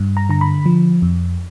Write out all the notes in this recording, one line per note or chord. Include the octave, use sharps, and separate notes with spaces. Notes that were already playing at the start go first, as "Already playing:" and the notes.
Already playing: G2
A#5
D3 A#5
B5
F3
F2